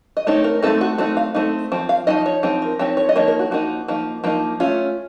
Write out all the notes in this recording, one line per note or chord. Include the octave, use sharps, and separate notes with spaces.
D#5
A3 C4 D#4 C#5
A#4
A3 C4 D#4 A4
F#4
A3 C4 D#4 F#4
F5
A3 C4 D#4
F3 C4
F5
F3 C4 D#4 D#5
C#5
F3 C4 D#4
A#4
F3 C4 D#4 C#5
C#5
D#5
F3 A#3 D#4 C#5
A#4
F#4
F3 A#3 D#4 F#4
F3 A#3 D#4
F3 A#3 D#4
A3 C#4 F4